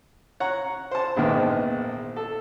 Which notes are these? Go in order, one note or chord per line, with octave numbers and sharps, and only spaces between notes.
C#5 F#5 A#5
C5 A5
A#1 E2 G#2 D#3 E3
A4